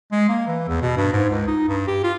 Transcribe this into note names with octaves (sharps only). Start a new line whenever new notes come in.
G#3
A#3
E3
E2
B2
G2
G#2
C#2
D#4
G2
G4
F4